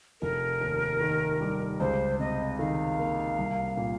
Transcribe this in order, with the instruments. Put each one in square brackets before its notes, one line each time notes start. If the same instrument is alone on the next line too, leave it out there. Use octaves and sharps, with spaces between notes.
[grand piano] F1 [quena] A#4
[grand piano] D#2
D#3
G3
[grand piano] C#2 [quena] C5
[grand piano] C3 [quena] D#5
[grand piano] D#3 [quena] F5
[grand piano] A#3
C2
A#2